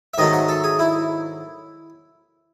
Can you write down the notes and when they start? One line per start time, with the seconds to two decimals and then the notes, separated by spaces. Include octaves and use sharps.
0.14 E5
0.18 G#2 D#3 F#3 A3 D#5
0.33 F#5
0.49 A4
0.64 G#4
0.79 E4